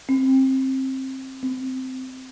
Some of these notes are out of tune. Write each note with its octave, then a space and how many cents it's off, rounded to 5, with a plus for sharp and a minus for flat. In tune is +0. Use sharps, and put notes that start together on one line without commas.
C4 +20
C4 -15